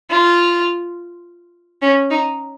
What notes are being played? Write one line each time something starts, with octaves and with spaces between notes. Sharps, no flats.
F4
C#4
D#4